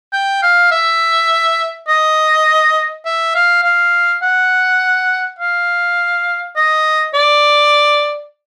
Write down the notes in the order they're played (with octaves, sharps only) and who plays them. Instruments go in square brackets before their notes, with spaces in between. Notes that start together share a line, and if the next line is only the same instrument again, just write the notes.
[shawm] G5
F5
E5
D#5
E5
F5
F5
F#5
F5
D#5
D5